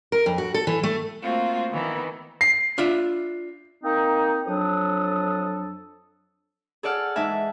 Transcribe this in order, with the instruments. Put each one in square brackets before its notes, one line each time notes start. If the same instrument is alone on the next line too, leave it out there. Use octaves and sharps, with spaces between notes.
[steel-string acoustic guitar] A#4
F2
F#4
A4
E3
A3
[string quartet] A3 A#3 C4 F4 F#4
D#3 E3 B3
[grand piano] C7
[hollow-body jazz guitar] D4 F4 E5
[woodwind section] A#3 C4 D#4
F2 F#3 D4 A4 D#6
[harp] G#4 A4 D5 F#5 F6
G#2 E3 D#4 E5 G#5 A5